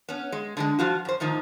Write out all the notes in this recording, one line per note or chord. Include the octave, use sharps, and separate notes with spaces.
B3 C#4
G#3
D3 E3 G#3
F3 F4 F#4
F#2 C5
A2 D#3 F3 D#4